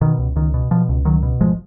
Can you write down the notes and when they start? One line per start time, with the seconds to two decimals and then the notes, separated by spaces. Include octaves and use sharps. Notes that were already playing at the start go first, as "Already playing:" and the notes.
0.01 B2 D#3
0.19 C#2
0.36 C#2 D#3
0.54 B2
0.71 B2 F3
0.89 C#2
1.05 C#2 D#3 F#3
1.23 B2
1.40 G#1 F3 G#3